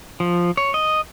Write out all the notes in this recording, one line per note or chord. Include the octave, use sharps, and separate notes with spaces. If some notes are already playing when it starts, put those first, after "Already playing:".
F3
C#5
D#5